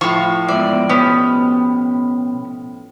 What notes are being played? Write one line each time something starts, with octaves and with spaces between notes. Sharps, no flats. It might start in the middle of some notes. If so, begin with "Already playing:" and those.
A2 F3 C#6
E2 G#2 D5 E5
B2 B3 C#4 G4